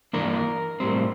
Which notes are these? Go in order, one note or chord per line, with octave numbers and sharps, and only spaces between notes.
G2 E3 A#3 D4 A#4
A2 G3 C4